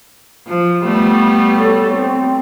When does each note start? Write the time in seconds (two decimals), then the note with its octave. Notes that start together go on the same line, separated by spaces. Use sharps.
0.47 F3
0.83 G3 A3 B3
1.57 A4 C#5
1.94 C4